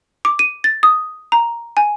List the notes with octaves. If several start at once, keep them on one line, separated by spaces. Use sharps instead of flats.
D6
D#7
A6
D#6
A#5
G#5